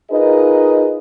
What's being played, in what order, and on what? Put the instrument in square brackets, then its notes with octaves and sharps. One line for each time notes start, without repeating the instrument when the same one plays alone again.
[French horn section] D#4 F4 G#4 A#4 B4 D#5